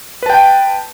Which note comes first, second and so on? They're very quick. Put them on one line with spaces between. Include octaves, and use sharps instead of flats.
B4 A5 G5